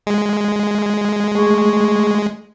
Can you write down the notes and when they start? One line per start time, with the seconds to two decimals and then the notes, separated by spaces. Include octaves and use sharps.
0.07 G#3
1.35 A3 G#4 C#6